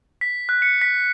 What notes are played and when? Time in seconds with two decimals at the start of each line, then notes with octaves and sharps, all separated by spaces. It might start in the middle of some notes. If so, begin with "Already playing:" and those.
0.21 B6
0.49 F#6
0.62 C#7
0.82 B6